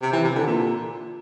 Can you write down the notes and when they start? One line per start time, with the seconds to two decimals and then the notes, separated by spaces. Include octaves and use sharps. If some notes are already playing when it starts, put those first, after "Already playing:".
0.02 C3
0.13 E3
0.24 C3
0.36 D3
0.47 A#2